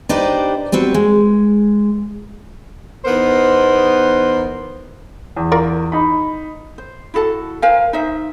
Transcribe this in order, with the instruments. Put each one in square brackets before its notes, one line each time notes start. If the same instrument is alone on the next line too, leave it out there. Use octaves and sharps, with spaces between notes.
[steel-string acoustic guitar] D4 D#4 G4 B4 C5 D5
G3 B3 C4 F#4
G#3
[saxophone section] E2 B3 D#4 A#4 C5
[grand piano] E2
[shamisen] F4 A#4 D5
[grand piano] D#4 B5
[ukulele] C5
E4 F#4 A4 A5
A#4 C5 F5 G#5
D#4 C5 E5